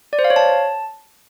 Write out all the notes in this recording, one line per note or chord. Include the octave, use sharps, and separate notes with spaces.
D5
C5
F5
C#5
A5